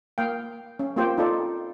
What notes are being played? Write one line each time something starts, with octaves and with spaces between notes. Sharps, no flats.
A#3 F5 G5
C#4
A#3 C4 F4 G4 C5 G5
D#4 F4 A4 D5